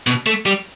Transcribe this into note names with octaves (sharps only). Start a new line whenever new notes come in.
B2
A3
G3